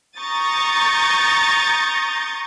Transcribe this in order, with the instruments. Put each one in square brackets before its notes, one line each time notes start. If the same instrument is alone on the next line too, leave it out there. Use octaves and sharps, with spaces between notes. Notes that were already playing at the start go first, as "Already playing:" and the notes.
[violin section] A#5 C#6 D#6 G6 A6